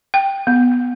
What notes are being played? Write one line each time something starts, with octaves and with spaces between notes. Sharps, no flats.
G5
B3